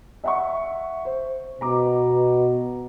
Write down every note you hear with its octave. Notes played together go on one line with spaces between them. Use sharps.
E5 F#5 C#6
C5
B2 A#5 D6